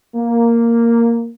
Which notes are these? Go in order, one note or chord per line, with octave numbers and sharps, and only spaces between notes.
A#3